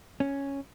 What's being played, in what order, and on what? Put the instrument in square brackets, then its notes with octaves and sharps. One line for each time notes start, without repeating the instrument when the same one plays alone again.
[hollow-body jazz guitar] C#4